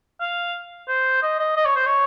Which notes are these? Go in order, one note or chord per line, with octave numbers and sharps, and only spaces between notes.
F5
C5
D#5
D#5
D#5
C#5
C5
C#5